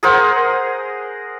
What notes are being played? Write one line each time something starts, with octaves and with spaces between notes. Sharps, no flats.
G#4 A#4 C5 F#5